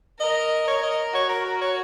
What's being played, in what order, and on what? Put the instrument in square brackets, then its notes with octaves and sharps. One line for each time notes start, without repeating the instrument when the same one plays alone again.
[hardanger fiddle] A#4 [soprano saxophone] D#5
[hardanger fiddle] A#4 [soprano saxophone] C#5
[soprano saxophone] D#5
[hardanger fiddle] F#4 [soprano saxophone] C#5
[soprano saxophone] A#4
A#4
C#5